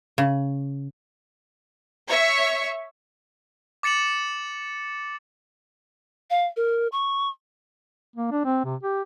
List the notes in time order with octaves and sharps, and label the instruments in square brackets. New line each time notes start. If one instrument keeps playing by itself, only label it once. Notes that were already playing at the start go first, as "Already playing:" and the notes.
[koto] C#3
[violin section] C#5 E5 C#6
[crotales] D6 A6 C#7 E7 F#7
[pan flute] F5
A#4
C#6
[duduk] A#3
D4
C4
C3
G4